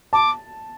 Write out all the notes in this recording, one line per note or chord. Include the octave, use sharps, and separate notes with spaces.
A5 D6